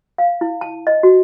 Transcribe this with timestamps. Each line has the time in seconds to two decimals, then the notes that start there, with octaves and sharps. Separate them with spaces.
0.18 F5
0.41 E4
0.61 A5
0.87 D#5
1.03 F#4